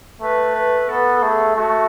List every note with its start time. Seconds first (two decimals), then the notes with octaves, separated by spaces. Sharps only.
0.21 A3 B4
0.55 B4
0.89 B3 A4
1.16 A4
1.22 A3 G#4
1.56 A3 F#4